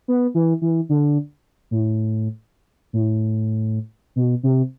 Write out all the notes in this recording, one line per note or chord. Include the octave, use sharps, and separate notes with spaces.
B3
E3
E3
D3
A2
A2
B2
C3